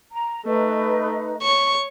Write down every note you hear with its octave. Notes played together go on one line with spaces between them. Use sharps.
A#5
A3 D#4 B4 D#5
C#5 C#6